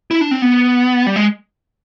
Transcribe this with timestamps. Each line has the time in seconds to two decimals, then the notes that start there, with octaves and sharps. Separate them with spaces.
0.11 E4
0.21 D4
0.31 C4
0.42 B3
1.06 G3
1.16 G#3